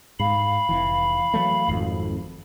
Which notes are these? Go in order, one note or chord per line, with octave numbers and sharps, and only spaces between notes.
G#2 G#3 F5 B5
F1 E3
E3 F#3 A3
G#1 F2